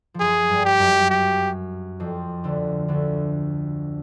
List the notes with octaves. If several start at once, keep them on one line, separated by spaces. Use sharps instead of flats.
F3
F#2 F#3 G#4
G2 G3
G4
F#2 F#3
G4
F2 F3
D2 D3
D2 D3